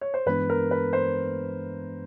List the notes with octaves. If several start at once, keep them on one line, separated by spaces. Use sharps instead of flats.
C#5
C5
G2 E3 G#3 B3 D4 B4
A#4
B4
C5